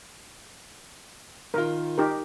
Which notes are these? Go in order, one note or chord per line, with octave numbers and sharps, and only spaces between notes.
D#3 F4 A#4
D#4 G4 A#4